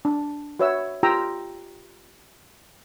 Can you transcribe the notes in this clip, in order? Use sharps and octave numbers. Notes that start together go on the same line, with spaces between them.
D4
F#4 B4 C#5 E5 E6
F4 G4 G5 A#5 D#6 E6